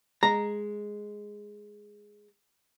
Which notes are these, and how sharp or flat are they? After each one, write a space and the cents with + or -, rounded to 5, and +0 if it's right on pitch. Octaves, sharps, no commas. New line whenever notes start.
G#3 +0 A#5 +0